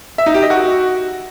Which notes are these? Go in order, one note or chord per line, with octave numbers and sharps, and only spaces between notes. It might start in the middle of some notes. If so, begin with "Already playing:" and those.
E5
D#4
G4
D#5
F#4